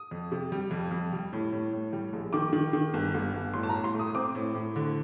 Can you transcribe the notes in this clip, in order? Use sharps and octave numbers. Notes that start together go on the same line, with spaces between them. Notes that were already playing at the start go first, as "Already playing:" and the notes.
Already playing: D#6
F2
C3
G3
F2
F2
G3
A2
A2
A2
G3
A#1
D#3 D6
D#3
D#3
G1
G1
G1
A2 C6
A5
A#5
A2
C6
A3
D#6
C4 D6
A2
A2
D3